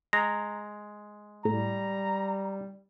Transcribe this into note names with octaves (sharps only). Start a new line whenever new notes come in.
G#3 A#5
A2 G3 A#5